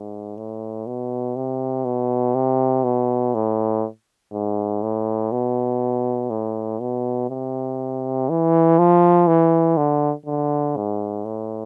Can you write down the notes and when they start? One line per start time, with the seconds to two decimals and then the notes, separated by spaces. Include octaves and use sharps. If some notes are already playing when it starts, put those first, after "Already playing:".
Already playing: G#2
0.37 A2
0.86 B2
1.36 C3
1.85 B2
2.35 C3
2.84 B2
3.34 A2
4.33 G#2
4.83 A2
5.32 B2
6.30 A2
6.81 B2
7.29 C3
8.29 E3
8.79 F3
9.27 E3
9.77 D3
10.26 D3
10.76 G#2
11.25 A2